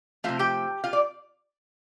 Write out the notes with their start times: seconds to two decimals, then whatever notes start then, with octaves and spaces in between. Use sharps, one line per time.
0.24 C3 F3 A3 F4 F5
0.39 G4 G5
0.84 F4 F5
0.93 D5